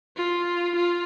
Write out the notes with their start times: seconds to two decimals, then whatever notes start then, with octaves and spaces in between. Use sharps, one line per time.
0.16 F4
0.76 F4